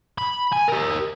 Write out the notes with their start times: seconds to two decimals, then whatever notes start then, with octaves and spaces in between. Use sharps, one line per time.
0.18 B5
0.52 G#5
0.68 G4 A#4